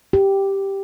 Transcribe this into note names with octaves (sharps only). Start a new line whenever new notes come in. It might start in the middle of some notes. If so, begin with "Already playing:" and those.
G4